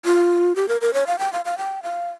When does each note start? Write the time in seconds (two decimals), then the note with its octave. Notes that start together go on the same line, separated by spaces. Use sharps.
0.05 F4
0.56 G4
0.68 A#4
0.81 A#4
0.94 C#5
1.07 F5
1.19 G5
1.33 F5
1.45 F5
1.58 G5
1.83 F5